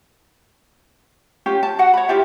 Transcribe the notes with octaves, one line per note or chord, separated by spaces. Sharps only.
C#4 F4 G4
A5
F#4 F#5
C#5 B5
E4 F4 G4 E5